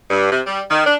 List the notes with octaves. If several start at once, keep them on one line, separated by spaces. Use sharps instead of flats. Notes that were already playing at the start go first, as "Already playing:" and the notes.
G2
C3
G3
D#3
D4